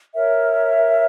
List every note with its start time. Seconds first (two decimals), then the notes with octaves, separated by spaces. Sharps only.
0.14 A#4 C#5 E5